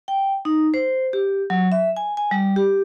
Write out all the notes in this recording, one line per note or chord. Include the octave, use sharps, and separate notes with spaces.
G5
D#4
C5
G4
F#3
E5
G#5
G#5
G3
G4